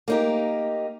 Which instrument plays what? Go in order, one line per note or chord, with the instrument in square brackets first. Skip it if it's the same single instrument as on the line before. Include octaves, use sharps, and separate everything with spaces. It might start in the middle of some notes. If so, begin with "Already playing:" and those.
[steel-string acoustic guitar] A#3 D#4 G4